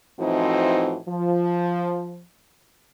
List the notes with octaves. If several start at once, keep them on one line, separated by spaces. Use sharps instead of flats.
A2 E3 F3 C4 D#4 F#4
F3